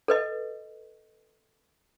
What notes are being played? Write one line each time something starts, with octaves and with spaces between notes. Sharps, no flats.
A4 B4 D#5